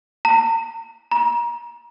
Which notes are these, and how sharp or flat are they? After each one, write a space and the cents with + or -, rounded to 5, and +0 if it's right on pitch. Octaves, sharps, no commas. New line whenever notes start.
A#5 -45
A#5 +30